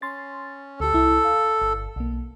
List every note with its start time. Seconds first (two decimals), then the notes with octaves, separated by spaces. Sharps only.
0.02 C#4 C6 A6
0.80 D2 G4 A4
0.93 C2 E4
1.25 F5
1.62 G1
1.96 B1 A#3